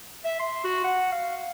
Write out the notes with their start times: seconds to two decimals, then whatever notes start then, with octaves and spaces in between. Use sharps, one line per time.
0.24 E5
0.39 C6
0.64 F#4
0.84 F#5
1.12 F5